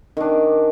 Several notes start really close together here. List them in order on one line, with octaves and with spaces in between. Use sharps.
D#3 D4 C#4